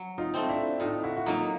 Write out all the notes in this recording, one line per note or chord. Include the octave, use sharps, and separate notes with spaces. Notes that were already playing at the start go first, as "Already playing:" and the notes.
Already playing: F#3
D#4 F4
A3 C4
D4 E4
A2 D#4 F4
E4 F#4
F#4
F#3 A#3 D#4 F4